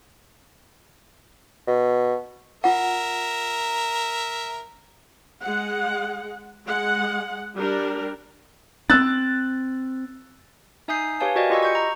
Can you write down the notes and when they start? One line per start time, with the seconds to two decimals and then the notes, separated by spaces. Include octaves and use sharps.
1.68 B2
2.64 F4 A#4 E5 F#5
5.44 G#3 F#5
6.67 G#3 F#5
7.56 G3 D4 G4 A#4
8.90 C4 D4 E6 F#6 A6
10.88 D#4 E5 G#5 D#6 G6 C7
11.20 G4 B4 C#5 F5 G#5 A5
11.36 F#4 A#4 D5 D#5 G5 G#5
11.50 F4 G4 D#5 B5 C#6 E6
11.63 C#6 G6 C#7
11.75 A#5